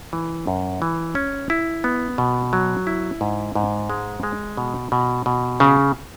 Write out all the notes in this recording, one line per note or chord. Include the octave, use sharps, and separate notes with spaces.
E3
F#2
E3
C#4
E4
B3
B2
F#3
E4
G#2
G#2
G#3
G#3
B2
B2
B2
C#3